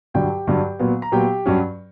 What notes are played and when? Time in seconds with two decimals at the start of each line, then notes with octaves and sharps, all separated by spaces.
0.14 G2 D3 F#3 G4 G5
0.47 G2 D3 F#3
0.79 A#2 F#3 B3
1.02 A#5
1.12 A#2 F#3 B3 G4 G5
1.46 G2 F#3 C#4